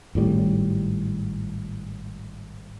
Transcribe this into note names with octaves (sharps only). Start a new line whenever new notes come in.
G#1 A2 G3